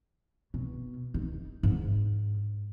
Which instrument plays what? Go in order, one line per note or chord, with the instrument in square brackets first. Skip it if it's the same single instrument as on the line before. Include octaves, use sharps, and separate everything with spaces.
[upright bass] B2
D#4
G#2